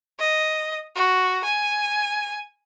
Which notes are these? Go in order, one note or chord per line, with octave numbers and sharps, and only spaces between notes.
D#5
F#4
G#5